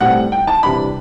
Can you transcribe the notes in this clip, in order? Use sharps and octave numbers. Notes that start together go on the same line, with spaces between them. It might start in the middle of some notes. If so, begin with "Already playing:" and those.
A2 G3 C4 F#5
G5
A5
C3 E3 G3 D4 B5